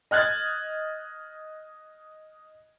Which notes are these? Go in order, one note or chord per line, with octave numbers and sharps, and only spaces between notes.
D#5 F6 F#6 G#6 A6